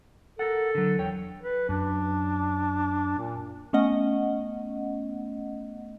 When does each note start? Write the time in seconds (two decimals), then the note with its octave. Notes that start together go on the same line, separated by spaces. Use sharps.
0.39 A4 A#4 F#5
0.75 D3 F#3
0.99 E2 C#5 G5
1.41 B4
1.69 F#2 D4
3.19 A#2
3.73 A3 B3 C#4 D#5 F#5